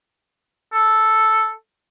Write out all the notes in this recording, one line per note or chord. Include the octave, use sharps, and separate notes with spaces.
A4